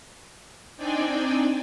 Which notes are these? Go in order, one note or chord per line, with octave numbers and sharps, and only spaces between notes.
C4 D4 D#4 D5 G5 G#5